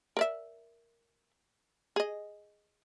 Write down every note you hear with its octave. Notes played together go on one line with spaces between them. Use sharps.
A#4 D5 E5
G#4 D#5